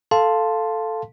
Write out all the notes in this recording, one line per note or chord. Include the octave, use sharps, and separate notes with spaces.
A4 F5 A5 C6